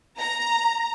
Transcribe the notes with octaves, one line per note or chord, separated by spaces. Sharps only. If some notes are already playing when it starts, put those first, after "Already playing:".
A#5